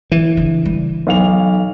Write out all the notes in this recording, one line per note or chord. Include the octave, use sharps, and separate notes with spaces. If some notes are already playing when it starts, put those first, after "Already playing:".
E3
C#3 D4
G3
B1 F5 F7